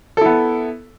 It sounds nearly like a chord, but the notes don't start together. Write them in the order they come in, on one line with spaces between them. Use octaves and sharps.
A4 E4 B3